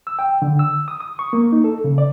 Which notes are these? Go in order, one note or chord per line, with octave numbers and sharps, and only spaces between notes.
E6
G5
D3
E6
D#6
D#6
C#6
A#3
D#4
A4
C#3
D5